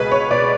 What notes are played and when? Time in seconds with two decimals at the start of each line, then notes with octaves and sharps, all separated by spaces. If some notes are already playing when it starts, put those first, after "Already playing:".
Already playing: C#2 B2 G#4 B4
0.11 C#5
0.31 B2 D5